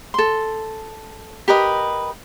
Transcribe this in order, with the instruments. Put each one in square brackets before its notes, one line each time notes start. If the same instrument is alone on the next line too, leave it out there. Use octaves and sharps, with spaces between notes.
[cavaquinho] A4 C6
G4 A#4 B4 D#5